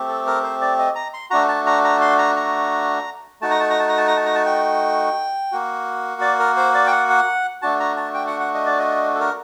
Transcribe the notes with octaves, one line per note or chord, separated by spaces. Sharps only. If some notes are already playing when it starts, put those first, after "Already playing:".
Already playing: A3 C4 G4
A4
A#4
C5
D5
D#5
A#5
C6
A3 D4 F#4 A#5
A5
A#5
A#5
C6
A#5
A#5
A3 D#4 F#4 A5
A#5
A5
A#5
A5
A#5
A5
A#5
A5
A#5
A5
G5
A#3 F#4
D5
A#4
C5
D5
G5
F#5
F#5
A3 D4 F#4 A5
A#5
A5
G5
F#5
F#5
D#5
D5
D#5
A4
A#4